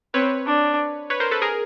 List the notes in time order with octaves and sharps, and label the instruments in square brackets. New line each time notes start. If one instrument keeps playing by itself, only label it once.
[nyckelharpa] C4 [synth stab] B4 C#5
[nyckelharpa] D4
[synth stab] B4 C#5
A#4 C5
A4 B4
G#4 A#4